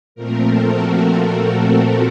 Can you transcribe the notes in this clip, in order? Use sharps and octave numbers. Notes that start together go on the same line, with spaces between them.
A#2 F3 A3 C4 A#4
A4
F#4
F#4